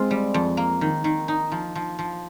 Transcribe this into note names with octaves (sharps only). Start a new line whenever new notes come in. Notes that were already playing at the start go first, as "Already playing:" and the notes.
Already playing: G#3 C4 F4
G3
F2
A#3
D#3
D#3
D#4
F3
F3
F3